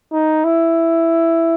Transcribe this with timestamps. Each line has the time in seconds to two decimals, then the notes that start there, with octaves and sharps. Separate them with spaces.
0.12 D#4
0.44 E4